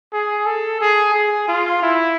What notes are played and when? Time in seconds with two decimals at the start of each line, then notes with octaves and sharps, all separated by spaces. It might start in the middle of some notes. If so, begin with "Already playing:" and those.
0.13 G#4
0.46 A4
0.81 G#4
1.14 G#4
1.48 F4
1.83 E4